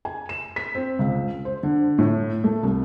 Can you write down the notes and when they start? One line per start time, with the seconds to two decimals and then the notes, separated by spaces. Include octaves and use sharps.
0.05 G#5
0.29 E7
0.56 B6
0.75 C4
0.99 C#2
1.45 C5
1.63 D3
1.99 A2
2.44 A3
2.63 C2